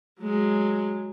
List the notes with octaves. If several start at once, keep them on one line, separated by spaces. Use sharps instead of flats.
F#3 G#3